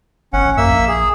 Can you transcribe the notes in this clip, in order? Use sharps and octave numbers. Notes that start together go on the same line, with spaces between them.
G1 C#4 F#5
A1
F#2 A#3 E5 E6
A#1
G#4